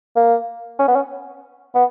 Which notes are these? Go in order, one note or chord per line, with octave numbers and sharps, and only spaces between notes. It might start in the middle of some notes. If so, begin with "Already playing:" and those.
A#3
C#4
B3
C#4
B3